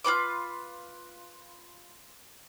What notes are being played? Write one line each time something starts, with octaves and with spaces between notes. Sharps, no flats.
F4 F#4 B4 D6